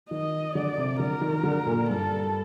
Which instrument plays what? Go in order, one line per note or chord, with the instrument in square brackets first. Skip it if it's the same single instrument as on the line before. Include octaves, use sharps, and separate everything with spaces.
[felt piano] D#3 [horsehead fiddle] D#5
[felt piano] D3 [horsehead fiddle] D5
[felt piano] C3
[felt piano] D3 [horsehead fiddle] A#4
[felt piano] D#3
D3
A#2
[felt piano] G2 [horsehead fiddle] A4